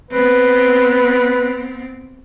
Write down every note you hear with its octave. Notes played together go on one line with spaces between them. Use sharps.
B3 C4 B4